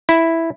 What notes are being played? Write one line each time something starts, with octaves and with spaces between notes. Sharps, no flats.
E4